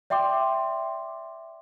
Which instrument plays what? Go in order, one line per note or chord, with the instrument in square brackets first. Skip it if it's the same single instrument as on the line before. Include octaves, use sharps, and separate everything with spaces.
[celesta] D5 E5 G5 C6 D6